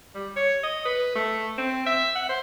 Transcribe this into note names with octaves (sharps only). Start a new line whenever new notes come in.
G3
C#5
D#5
B4
A3
C4
E5
F#5
C5